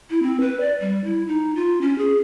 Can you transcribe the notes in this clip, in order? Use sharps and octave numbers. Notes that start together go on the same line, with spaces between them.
E4
C4
B4
D5
G3
E4
D#4
F4
C#4
G#4